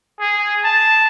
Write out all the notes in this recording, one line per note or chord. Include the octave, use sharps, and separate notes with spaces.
G#4
A5